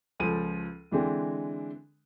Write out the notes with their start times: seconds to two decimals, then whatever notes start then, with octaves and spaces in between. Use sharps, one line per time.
0.19 C#2 F3 A4 D#7
0.92 D3 E3 G#3 C4 D4